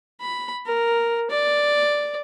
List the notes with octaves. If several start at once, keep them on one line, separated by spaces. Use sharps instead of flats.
B5
A#4
D5